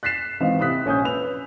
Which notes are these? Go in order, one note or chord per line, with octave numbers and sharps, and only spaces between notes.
F#6 A6 B6 C7 E7
G#1 E3 D#5 F5
C3 E4 D#6 F#6 B6
A#1 C#4 G#5 D#6 G6
B4 E6 F7